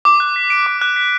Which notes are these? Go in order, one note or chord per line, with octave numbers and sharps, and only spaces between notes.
D6
F#6
B6
D7
D6
F#6
B6